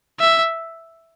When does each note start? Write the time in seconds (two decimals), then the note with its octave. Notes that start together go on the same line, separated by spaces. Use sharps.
0.20 E5